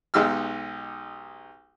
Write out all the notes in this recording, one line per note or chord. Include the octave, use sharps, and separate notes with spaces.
B1 G#3 D#4 G4 E6 F6